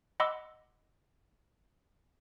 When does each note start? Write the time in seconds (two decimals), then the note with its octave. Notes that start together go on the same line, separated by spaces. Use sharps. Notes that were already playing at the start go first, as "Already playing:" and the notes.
0.20 D#5 F#5 B5 C6 D6 E6